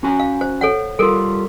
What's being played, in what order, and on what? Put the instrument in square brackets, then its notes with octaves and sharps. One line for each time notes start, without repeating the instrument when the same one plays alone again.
[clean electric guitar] C#4 F#4 G#5
[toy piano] F5
C5
A4 C#5 F#5
[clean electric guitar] G3 F4 [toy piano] A4 A#4